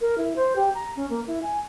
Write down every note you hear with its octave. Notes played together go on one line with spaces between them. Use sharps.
A#4
E4
C5
G4
A#5
C#4
A#3
E4
G#5